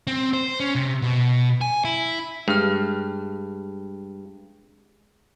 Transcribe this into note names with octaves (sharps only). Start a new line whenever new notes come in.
C4
C5
C#4
C3
B2
G#5
E4
G2 G#3 G#4 F6